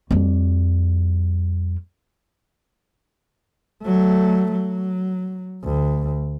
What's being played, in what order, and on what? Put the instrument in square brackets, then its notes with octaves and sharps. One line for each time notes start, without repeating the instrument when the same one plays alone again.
[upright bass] F2 G3
[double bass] F#3 A3
F#3
D2